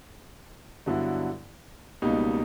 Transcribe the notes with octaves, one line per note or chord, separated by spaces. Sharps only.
G2 D3 F#3 B3 E4
C#2 B2 G3 A#3 D#4